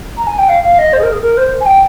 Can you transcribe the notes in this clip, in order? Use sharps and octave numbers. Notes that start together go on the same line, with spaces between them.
A#5
G#5
G5
F5
F5
D#5
C5
G#4
A#4
G#4
A#4
C5
G#5
G5